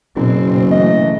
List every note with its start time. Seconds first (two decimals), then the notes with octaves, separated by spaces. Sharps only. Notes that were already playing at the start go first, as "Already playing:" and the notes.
0.16 F#1 B2 C4
0.71 E3 A3 D#5